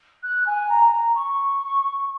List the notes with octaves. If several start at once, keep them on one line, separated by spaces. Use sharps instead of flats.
F#6
G#5
A#5
A#5
C#6